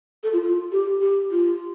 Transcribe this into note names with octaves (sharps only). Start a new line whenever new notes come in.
A4
F4
F4
G4
G4
F4